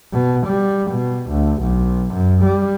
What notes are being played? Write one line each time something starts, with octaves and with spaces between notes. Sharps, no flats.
B2
G3
B2
D2
B1
F#2
G3